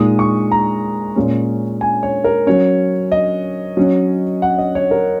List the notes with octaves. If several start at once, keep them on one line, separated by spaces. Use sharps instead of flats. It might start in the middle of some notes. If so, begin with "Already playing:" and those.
Already playing: A#2 G#3 D#4 D#6
C#6
A#5
A#2 G#3 C#4
G#5
C#5
A#4
F#3 C#4 C#5
D#5
F#3 C#4
F#5
D#5
C#5
A#4